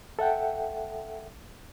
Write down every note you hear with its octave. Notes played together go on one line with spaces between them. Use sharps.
A4 E5 F#5 G5